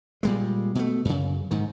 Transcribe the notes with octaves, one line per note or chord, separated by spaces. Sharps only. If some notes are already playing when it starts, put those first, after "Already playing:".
A#2 G3 G#3
B2 A3
F#2 C#3
G#2 D#3